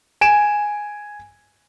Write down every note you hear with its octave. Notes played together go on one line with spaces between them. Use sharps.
G#5 D7 E7